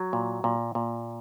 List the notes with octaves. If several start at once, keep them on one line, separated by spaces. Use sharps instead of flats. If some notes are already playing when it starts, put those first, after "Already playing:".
Already playing: F#3
A#2
A#2
A#2